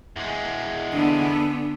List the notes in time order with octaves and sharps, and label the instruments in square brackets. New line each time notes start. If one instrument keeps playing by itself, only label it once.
[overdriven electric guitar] E2 G#3
[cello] D3 B3 [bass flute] D4